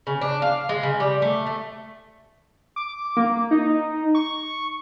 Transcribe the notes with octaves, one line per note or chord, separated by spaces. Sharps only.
C#3
D4
F5
G#3
C#3
G3
A3
A3
D6
A#3
D#4
C#6